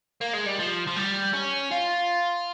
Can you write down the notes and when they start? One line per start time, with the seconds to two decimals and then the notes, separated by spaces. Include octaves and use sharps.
0.21 A#3
0.33 G#3
0.46 G3
0.59 F3
0.87 F3
0.96 G3
1.34 C#4
1.71 F4